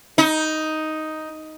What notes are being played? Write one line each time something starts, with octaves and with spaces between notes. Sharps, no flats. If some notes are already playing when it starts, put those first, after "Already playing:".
D#4